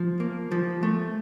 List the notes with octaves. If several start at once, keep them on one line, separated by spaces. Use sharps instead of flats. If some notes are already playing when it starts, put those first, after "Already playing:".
Already playing: F3
A#3
F3
A3